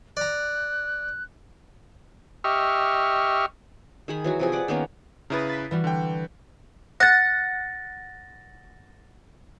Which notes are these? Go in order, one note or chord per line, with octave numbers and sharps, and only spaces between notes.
D5 A#5 F#6
G4 D#5 E5 C#6 F6
D#3 G#4 B5
E3 F#3 F#4
C3 F3 G#4
B4 D5 F#5
D#3 A#3 B3 C#4
C#3 E4 B4 A#5 D#6 A6
A6 B6
E3 G3 F#4
D3 G5
F#5 A6 A#6